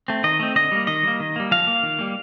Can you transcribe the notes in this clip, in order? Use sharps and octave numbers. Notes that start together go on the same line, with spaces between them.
A3 C4
D#3 D#5
A3 C4
D3 D#5
G3 A#3
D#3 D#5
G3 A#3
D#3
G3 A#3
F3 F5
A#3
D#3
G3 A#3